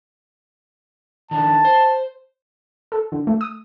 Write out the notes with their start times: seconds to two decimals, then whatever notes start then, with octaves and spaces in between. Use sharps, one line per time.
1.31 D#3 D4 A5
1.65 C5
2.92 A4
3.12 D3
3.27 A3
3.41 D#6